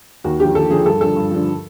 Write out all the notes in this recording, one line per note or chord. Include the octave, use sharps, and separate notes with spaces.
D#2 F#4
D3 F3 G4
D#2 A4
D3 F3 G#4
G2 A4
D3 F3 A4
G2
D3 F3